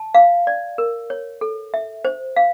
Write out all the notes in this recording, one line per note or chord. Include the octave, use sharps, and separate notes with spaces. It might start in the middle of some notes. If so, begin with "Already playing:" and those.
Already playing: A5
F5
D5
A#4
C#5
A4
E5
C5
F5